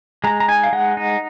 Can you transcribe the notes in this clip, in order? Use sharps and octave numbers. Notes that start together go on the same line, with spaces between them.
G#3 A#5
A#5
D#4 G#5
F5
G#3 F#5
D#4